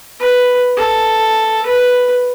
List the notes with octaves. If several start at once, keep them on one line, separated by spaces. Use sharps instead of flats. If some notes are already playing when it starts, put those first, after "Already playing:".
B4
A4
B4